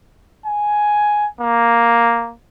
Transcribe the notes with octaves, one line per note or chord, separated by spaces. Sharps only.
G#5
A#3